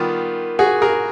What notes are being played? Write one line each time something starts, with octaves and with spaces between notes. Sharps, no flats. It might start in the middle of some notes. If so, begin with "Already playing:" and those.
Already playing: D#3 G3 B3 F4 G4
F#4 G#4
G#4 A#4